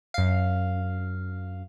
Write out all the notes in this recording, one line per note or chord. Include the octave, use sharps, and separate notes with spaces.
F#2 F5